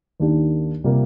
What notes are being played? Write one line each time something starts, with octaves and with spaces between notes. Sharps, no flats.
D#2 D#3 A#3 D4 G4
C3 G3 A#3 F4